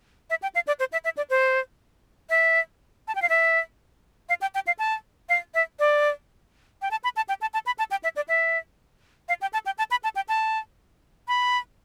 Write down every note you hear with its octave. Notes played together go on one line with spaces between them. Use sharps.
E5
G5
F5
D5
C5
E5
E5
D5
C5
E5
A5
G5
F5
E5
F5
G5
G5
F5
A5
F5
E5
D5
G5
A5
B5
A5
G5
A5
A5
B5
A5
G5
E5
D5
E5
F5
G5
A5
G5
A5
B5
A5
G5
A5
B5